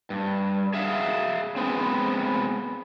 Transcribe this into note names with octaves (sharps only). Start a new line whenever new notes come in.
G2
G#4 E5 F5
G#3 B3 C4